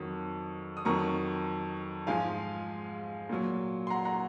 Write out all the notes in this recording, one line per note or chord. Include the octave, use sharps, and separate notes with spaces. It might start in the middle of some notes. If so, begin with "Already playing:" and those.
Already playing: F2 D#3 F#3
D#6
F2 D#3 F#3 A#5 C#6
G#2 F3 G#3 F5 G#5
A#2 F#3
C6
F#5 A#5
F#5 A#5